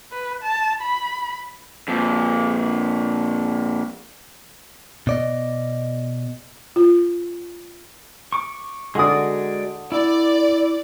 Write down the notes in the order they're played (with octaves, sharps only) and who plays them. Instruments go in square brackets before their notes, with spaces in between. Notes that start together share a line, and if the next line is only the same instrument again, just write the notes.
[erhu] B4
A5
B5
[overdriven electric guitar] F2 A#2
[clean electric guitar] B2 D5 D#5
[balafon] F4
[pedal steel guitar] C#6 D6
[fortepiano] D3 D#6 [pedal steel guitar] G#3 F#4 D5
[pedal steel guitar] E4 [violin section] D5